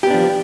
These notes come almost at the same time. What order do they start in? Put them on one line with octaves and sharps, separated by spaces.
G4 B3 D4 F3